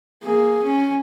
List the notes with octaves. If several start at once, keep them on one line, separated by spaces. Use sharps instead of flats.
A#3 G#4
C#4